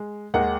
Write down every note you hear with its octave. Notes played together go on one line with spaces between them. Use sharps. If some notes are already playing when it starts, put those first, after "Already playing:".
Already playing: G#3
D#2 D#3 G#3 D#4 F#5